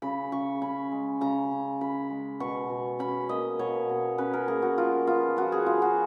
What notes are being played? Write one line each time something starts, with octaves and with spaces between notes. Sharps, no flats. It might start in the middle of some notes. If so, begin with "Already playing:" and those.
C#3 B5
C#3 C#6
C#4 B5
G#3
C#3 A#5
C#3
C#4 B5
G#3
B2 C#6
B2
C#4 B5
A#3 D#5
B2 C#5
B2
C#4 B4
A#4
A#3 G#4
F#4
F3 F4
B3 F4
F3 F#4
G#4
B3 F4
F#4